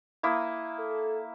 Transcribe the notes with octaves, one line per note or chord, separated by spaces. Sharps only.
A#3 E4 D#6
A4